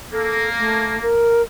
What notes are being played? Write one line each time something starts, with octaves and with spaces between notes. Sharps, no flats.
A#3 A4
A3
A#4